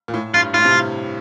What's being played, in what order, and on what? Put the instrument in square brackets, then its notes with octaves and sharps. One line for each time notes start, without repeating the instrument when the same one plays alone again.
[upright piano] A#2
A2
[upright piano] G2 [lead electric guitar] F4
[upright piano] A2 [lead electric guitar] F4
[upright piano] C3